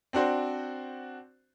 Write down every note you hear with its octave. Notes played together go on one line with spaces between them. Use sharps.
C4 D4 F#4 C5